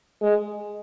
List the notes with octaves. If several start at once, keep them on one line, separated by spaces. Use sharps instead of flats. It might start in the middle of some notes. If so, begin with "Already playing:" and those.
G#3